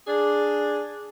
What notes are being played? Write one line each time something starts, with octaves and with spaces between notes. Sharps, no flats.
D4 G#4